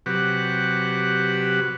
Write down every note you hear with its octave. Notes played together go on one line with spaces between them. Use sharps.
C3 F#3 G4 B4 F#5